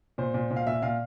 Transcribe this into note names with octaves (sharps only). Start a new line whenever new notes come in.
A#2 C5
A#2
A#2
F5
A#2 E5
A#2 F5